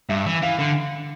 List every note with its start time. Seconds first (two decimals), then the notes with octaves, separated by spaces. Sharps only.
0.09 G2 E5
0.26 E3
0.42 E3 F5
0.59 D3